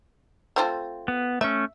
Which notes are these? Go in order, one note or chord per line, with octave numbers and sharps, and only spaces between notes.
A3 C4 F4
B3
A3 C#4 E5